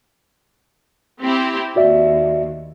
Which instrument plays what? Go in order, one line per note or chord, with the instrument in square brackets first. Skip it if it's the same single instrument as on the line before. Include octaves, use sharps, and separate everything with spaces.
[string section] C4 E4 G4
[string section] D#2 [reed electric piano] F#4 D5 E5